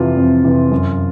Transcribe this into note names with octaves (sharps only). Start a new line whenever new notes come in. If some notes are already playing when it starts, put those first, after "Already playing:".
Already playing: F2 C3 E3 F4
F2
C3 E3
F#2